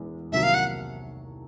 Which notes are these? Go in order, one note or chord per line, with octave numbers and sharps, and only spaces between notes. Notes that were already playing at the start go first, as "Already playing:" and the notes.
Already playing: E1 E2 E3 G#3
C2 C3 D#3 F#3 A#3 E5
F5
F#5